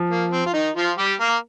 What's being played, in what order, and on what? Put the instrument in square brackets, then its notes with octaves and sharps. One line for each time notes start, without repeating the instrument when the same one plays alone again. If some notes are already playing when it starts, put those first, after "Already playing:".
Already playing: [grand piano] F3
[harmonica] A#3
C4
F4
D#3 D#4
F3 F4
G3 G4
A#3 A#4